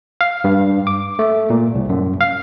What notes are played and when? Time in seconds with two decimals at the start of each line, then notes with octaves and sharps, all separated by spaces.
0.21 F5
0.44 G2
0.87 D6
1.19 A3
1.50 A#2
1.75 C2
1.89 F#2
2.21 F5